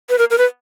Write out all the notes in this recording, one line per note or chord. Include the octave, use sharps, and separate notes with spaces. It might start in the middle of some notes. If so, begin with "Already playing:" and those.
B4
A#4
A#4
B4